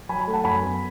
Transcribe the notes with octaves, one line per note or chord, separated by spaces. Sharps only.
F#3 G#5 B5
G#5 B5
A3
F#5 A5
F#2 G#5 B5
B3